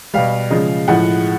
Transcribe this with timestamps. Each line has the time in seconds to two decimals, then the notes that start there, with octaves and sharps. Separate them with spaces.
0.14 B2 G3 F5
0.50 C#3 F3 G#3
0.88 A2 F3 G#3 F#5